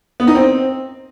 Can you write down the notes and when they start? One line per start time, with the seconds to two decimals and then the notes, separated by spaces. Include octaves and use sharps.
0.20 B3
0.27 D#4
0.35 C4